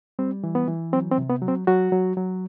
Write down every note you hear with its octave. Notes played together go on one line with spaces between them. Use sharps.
G3 C4
E3
B3
E3
F#3 C4
C4
C3
B3
F#3
C4
F#3 F#4
F#3
F#3